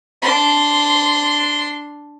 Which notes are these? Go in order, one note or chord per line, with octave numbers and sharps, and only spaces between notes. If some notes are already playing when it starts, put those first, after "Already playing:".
D4 C6